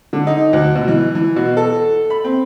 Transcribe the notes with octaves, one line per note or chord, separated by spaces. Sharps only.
D3
D#4
D2
B2
E3
E3
B2
A4
B5
C4